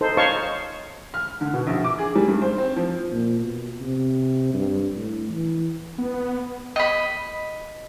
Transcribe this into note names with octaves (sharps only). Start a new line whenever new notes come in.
D#4 A4 C5
C5 C#5 D#5 F5 A5 C#6
F6
D3
B2
A#1
D6
G#4
G3
G2
C5
C4
F3
A#2
B2
C3
G2
A2
E3
B3
D#5 B5